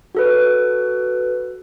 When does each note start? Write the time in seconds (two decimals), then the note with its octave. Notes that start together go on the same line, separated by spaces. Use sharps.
0.15 F#4 A4 B4